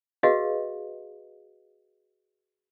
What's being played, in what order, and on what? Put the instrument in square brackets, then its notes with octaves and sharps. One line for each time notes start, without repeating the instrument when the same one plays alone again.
[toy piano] F#4 G#4 B4 D#5 F5